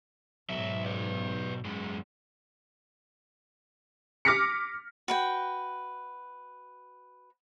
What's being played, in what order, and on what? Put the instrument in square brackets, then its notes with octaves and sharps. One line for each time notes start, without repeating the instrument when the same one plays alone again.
[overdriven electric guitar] B1 F#3 [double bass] G#2 [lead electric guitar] E5
[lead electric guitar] B4 D5
F#2 G#3
[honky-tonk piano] D6 F6 A#6 B6 C#7
[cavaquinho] F#4 B4 G5